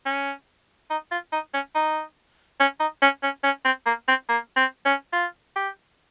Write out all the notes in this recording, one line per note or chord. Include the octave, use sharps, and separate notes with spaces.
C#4
D#4
F4
D#4
C#4
D#4
C#4
D#4
C#4
C#4
C#4
C4
A#3
C4
A#3
C4
C#4
F4
G4